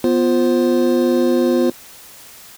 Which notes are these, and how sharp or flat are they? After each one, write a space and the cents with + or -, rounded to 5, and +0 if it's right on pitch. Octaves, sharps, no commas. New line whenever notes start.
B3 +0 F4 +0 C5 +5